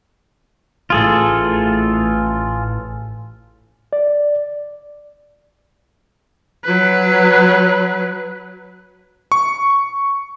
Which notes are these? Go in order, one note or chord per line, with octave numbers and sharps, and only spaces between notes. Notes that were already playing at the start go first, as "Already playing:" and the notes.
A1 F4 G#4 A4
D5
F#3 B4
C#6